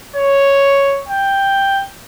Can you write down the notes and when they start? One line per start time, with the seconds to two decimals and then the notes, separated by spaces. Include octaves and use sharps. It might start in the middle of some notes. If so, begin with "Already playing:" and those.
0.16 C#5
1.08 G5